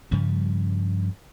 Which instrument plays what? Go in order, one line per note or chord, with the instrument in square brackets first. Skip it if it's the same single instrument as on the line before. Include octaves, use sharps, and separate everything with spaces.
[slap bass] G2 C#3 F3 G3